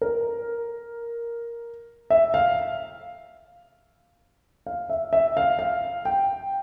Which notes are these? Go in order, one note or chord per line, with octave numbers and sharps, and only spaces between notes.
A#4
E5
F5
F5
E5
E5
F5
F5
G5